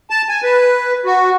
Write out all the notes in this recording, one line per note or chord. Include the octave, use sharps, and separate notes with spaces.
A5
G#5
B4
F#4